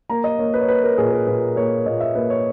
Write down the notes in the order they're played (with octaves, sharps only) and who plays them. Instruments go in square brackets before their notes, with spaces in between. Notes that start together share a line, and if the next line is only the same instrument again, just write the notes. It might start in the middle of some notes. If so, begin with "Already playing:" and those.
[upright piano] A#3 A#5
D#5
A#3 C#5
B4
C#5
A#3 B4
A#4
A#2 G#4
A#4
A#2 B4
A#3 C#5
A#2 D#5
E5
A#3 B4
C#5